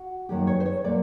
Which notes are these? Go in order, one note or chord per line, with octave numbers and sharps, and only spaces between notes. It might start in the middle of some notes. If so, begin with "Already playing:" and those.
Already playing: F#4
F#2 D#3 F#3 A#3 G4
C#5
C5
C#5
A#2 F#3 A#3 D5